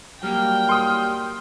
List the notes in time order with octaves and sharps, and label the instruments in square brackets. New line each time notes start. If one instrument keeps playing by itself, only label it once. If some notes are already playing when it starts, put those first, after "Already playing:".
[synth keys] F#3 G3 A#3 [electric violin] G5 [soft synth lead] F6
[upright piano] C6 D#6